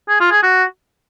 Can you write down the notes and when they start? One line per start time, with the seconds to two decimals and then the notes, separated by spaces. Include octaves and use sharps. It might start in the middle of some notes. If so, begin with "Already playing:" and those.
0.09 G#4
0.20 F4
0.32 G#4
0.43 F#4